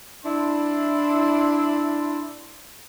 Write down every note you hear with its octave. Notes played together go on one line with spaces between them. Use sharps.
D4 E4 C6